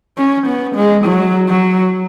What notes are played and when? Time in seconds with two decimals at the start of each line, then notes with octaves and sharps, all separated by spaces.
0.18 C#4
0.47 B3
0.76 G#3
1.05 F#3
1.49 F#3